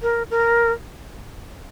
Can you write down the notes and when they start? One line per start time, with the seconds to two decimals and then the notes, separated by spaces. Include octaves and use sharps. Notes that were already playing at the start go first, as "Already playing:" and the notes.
0.02 A#4
0.31 A#4